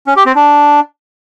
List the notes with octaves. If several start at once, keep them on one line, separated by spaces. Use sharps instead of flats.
C#4
G4
C4
D4